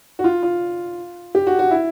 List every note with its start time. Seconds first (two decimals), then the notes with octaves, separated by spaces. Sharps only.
0.19 F#4
0.24 F4
0.43 F4
1.35 G4
1.47 F#4
1.59 F#4
1.71 E4